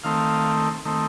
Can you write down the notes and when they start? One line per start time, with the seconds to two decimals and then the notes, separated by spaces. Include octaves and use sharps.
0.04 D#3 A3 C4 F5
0.85 D#3 A3 C4